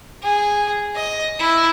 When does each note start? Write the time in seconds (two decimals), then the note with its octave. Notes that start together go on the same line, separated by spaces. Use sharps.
0.23 G#4
0.96 D#5
1.39 E4